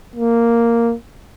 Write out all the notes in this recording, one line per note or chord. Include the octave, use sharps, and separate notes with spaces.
A#3